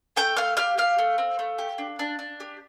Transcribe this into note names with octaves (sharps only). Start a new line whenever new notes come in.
A3 G5 G6
A3 F5 F6
G4 F5 F6
G4 F5 F6
A3
C4
A3
G4
D4
D4
D4
G4